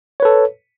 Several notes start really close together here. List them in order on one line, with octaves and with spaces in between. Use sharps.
C#5 B4 A4